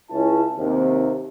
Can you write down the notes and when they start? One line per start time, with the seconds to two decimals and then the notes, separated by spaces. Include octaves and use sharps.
0.10 C#2 C#4 E4 A5
0.58 D#2 C3